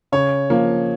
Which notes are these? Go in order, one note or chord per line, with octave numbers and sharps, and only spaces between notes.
C#3 C#5
F3 A#3